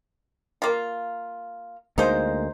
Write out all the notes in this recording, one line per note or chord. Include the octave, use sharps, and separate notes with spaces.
A#3 F4
D2 G#3 A#3 D#4 C5